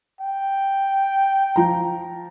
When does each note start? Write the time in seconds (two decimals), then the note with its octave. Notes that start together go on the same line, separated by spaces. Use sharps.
0.21 G5
1.56 F3 A#5